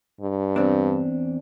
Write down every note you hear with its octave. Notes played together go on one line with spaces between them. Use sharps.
G2
E2 C4 D4